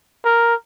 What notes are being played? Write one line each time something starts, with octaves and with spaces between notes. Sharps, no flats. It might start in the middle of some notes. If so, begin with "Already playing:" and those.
A#4